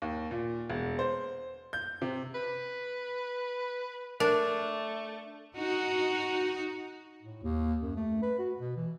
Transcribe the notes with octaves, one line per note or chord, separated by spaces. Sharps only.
D#2
A#2
E1
C5
G6
C3
B4
A3 D4 A#4
D#4 F#4
A2
D#2
F#2
A3
B4
F#4
B2
E3